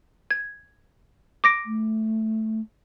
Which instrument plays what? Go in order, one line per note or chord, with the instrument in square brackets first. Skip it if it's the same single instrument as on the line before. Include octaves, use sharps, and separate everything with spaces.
[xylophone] G#6
D6 A#6 D7
[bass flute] A3